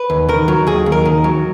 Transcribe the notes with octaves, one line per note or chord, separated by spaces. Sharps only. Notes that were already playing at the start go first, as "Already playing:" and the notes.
Already playing: B4
D#2
D#3 A#4
F#3
D#2 G#4
D#2
A#4
D#3
F#3